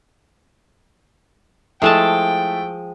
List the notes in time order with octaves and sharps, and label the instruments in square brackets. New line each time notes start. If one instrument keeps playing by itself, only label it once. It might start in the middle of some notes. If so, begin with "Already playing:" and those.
[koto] F3 G#3 A5 [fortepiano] A3 E4 [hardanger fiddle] G5